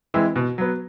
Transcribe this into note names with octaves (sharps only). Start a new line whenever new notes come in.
E3 G#3 C4 E4
B2
F#3 B3